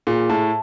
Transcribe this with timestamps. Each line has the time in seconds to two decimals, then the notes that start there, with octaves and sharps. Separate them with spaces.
0.07 A#2 G#4
0.29 A2 A5